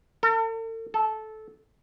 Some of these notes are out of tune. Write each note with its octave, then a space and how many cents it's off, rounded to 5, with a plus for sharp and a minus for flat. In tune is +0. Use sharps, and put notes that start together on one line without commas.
A4 +45
A4 -15